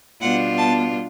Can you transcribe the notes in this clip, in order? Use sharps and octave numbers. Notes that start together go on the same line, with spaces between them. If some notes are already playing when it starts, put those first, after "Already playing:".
B2 G3 B3 D4 F4 F#5
A5